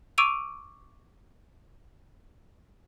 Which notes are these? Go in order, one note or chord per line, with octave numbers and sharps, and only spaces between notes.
C#6 D6 E6 D7 D#7 F7